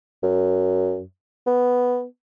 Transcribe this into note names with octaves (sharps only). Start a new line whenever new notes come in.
F#2
B3